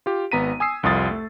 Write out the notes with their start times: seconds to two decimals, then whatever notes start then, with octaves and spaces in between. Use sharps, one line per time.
0.06 F4 G4
0.32 G#1 B3 A#5 B6 D#7
0.60 G#5 D#6 E6 C7
0.83 C2 F2 F4 D#6 A6
1.11 A3